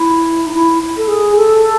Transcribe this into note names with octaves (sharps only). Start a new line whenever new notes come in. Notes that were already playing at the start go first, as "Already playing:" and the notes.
Already playing: E4
D#4
E4
A4
G#4
A4